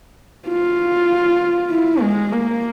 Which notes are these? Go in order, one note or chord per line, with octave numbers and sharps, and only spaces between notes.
F4
E4
G#3
A#3